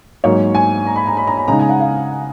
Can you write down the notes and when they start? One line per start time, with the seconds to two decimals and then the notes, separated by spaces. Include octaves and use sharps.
0.24 G#2 F#3 A#3 C#5
0.55 G#5
0.87 A#5
0.96 B5
1.07 A#5
1.17 B5
1.27 A#5
1.38 B5
1.48 C#3 G#3 D#4 A#5
1.59 G#5
1.69 F#5
1.80 F5